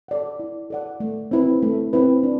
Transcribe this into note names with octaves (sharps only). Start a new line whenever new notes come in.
A4 D5 F#5
E4
A4 D5 F#5
A3
C4 E4 B4
A3
C4 E4 B4
D4